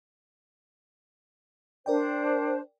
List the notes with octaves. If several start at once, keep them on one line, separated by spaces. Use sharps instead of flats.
D4 A#4 C5 D5 G5